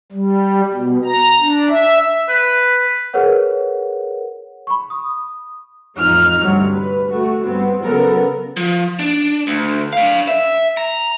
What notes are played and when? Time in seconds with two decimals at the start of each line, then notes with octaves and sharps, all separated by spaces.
0.12 G3
0.74 B2
1.05 A#5
1.39 D4
1.69 E5
2.29 B4
3.14 G#4 A#4 B4 C#5 F#5
4.67 B5 C#6
4.90 D#6
5.97 A1 F2 D#4 F6
6.44 D2 G2 C3 F#3
6.72 B4
7.08 A3 F#4
7.44 G2 G3 B3 C4
7.83 C#3 F#3 B3 A4 A#4
8.57 F3
8.99 D4
9.47 D2
9.93 D4 F5
10.28 E5
10.77 A#5